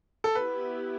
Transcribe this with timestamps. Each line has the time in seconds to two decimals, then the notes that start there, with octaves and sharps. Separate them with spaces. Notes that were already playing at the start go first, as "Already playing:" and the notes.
0.24 A4
0.35 B3 E4 G4 B4